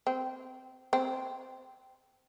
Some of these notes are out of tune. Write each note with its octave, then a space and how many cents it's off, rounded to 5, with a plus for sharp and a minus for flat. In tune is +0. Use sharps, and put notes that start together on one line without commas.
C4 -15
C4 -10